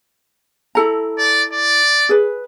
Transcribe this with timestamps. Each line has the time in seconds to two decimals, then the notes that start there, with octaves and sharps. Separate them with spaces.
0.75 E4 A4 A#5
1.18 D5
1.52 D5
2.09 G#4 B4